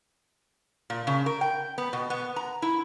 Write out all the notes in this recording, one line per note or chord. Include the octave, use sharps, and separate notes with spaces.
A#2
C#3
A#4
G5
B3
B2
B3
A#5
E4